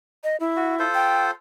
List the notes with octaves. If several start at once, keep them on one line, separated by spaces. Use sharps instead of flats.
D#5
E4
F#4
F4 A4 C5
G5